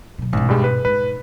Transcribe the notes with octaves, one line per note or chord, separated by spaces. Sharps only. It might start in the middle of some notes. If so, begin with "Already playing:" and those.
B2 F#3
A1 G#2 B2
G2 G3 G#3
B4
G#2 B4